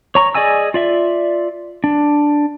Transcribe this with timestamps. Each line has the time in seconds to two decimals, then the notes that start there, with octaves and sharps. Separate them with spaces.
0.15 C#5 A#5 C#6
0.35 G#4 D5 D#5 G#5 E6
0.74 F4 D5 E5
1.84 D4